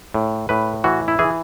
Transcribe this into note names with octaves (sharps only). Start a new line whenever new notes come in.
A2
A2 B4
E3 F#4
E4
E3 G#4